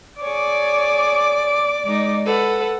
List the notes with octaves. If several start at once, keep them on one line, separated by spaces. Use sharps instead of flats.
G#4 C#5 D5 D6
G#3 D#4
A4 B4 F#5